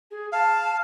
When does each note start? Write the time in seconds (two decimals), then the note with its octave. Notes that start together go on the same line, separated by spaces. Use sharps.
0.10 G#4
0.32 F5 A5